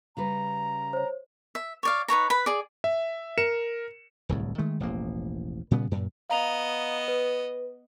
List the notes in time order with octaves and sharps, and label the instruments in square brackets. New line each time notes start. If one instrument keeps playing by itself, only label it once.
[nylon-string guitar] C#3 G3 B4 [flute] A#5
[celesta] C5 C#5
[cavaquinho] E5
C#5 D5 F5
D#4 B4 C#5 A#5
B4 B5
G#4 D5
[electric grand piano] E5
A#4 C#7 E7
[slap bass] D1 C2 A2
D#3 G#3 A3
E1 A1 F3 A#3
A#2 C#3 G3 B3
F#2 A#2
[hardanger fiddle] B3 D#5 [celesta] F5 A#5 F7
[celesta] B4